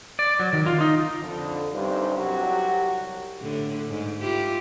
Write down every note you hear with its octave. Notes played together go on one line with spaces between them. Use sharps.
D5
F#3
D#3
F4
D#4
F2 D3
C2 G2 C#4 D#4 C5
C2 F#3 F#4 G4
A2 D3
G#2
E4 F4 G4